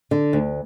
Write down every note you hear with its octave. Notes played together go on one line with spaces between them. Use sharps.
D3
D2